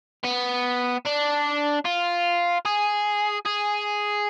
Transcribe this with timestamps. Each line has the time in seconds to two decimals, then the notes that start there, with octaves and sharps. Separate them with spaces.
0.24 B3
1.05 D4
1.85 F4
2.65 G#4
3.46 G#4